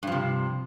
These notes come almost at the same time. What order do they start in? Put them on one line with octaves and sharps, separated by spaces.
G2 F3 C3